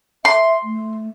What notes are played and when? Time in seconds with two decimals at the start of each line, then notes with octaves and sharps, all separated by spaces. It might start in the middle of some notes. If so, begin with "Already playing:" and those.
0.25 E5 C6
0.63 A3